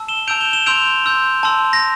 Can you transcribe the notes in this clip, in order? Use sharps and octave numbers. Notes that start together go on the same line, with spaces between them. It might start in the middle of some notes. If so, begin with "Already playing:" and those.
Already playing: A5 E6
E7 G7
A5 E6 G6 D7 F7
E7 G7
E7 G7
C6 E6 G6 D7 F7
C6 E6 G6
A5 C6 E6
A#6